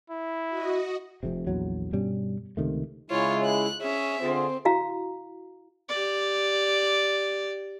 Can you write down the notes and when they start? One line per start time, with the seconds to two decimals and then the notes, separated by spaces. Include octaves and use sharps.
0.10 E4
0.49 F#4 D#5
1.23 F1 F2 C3
1.47 A#1 E2 F#3
1.92 G2 B2 G3 C#4
2.57 C#2 C3 D#3 A3
3.10 C#3 G#3 E4 F4 C#5
3.45 F#6
3.82 C#4 G#4 E5
4.22 D3 C4 F4 G#4
4.65 E4 F#4 F5 A#5
5.89 G4 D5